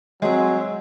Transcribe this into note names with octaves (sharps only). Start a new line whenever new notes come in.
F#3 G#3 C4 G#4 D#5 E5